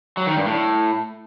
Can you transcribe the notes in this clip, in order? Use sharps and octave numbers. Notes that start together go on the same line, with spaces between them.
F#3
D#3
G2
A2